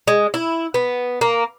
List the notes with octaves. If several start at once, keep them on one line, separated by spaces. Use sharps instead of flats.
G#3
E4
B3
A#3